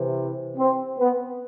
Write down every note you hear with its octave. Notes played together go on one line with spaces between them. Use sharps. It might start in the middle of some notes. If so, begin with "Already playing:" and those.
Already playing: C3 E3
C4
B3